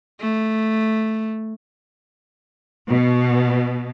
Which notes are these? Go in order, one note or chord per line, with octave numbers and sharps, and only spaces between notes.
A3
B2